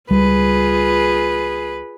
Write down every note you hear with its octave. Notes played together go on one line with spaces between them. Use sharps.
C#2 G3 F4 G#4 B4